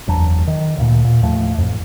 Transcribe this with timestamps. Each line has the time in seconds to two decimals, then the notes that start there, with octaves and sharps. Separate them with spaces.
0.07 F#1 E2 F#3 D4
0.47 D#3
0.77 D2 A#2
1.05 D#1 A#2
1.22 D#2 A2 F3 A3
1.58 A1 F2